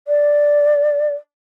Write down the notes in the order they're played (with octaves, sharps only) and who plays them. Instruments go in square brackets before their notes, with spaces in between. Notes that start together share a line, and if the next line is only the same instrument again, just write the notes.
[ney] D5